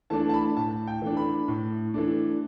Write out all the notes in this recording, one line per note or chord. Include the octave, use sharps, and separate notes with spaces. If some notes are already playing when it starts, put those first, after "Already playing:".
E3 A3 D4 A5
A5
B5
A2 A5
G5
E3 A3 D4
B5
A2
E3 A3 D4